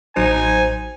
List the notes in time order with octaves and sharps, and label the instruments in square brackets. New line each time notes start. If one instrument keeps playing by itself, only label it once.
[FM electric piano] A1 F#3 C5 [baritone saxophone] D#4 [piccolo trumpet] G#5